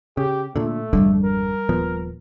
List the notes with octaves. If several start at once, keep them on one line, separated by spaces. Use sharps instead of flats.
C#3 G4
A#2 D3 A3
G#1 F2 D3 G3
A#4
D#1 F3 B3